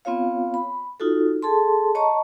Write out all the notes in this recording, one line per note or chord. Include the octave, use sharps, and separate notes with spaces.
B3 C4 F4 C#5 F5
B5
D#4 F4 F#4 A4
G#4 A4 A5 C6
C#5 D#5 A5 A#5 C#6